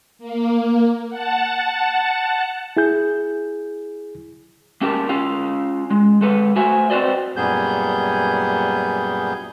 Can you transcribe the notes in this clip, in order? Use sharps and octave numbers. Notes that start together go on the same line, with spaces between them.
A#3
F#5 A5
E4 G#4 G6
A#3 C#4 G4 A#4 A5
C#4 F4 F5
G#3
G#3 A4 B4
A3 F#4 C5 E5 G#5
C4 F#4 B4 C5 D5 D#5
F#2 A#2 G3 B3 G#4 G6